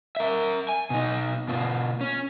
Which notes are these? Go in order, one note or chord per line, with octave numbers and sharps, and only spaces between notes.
A#4 E5
G#5
B2 D#4
B2 F4
C#4